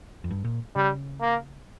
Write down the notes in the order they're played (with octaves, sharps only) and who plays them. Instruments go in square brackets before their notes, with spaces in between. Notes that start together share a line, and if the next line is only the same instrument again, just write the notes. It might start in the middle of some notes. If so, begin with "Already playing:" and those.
[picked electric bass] F2
G2
A#2
[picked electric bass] C#3 [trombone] G3
[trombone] A#3